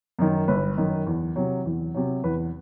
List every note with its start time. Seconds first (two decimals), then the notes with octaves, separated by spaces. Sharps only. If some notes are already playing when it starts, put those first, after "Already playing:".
0.19 F#2 D#3
0.48 G1 B4
0.78 F#2 D#3
1.07 E2
1.36 C3 F#3
1.65 E2
1.94 C3 F#3
2.24 E2 B4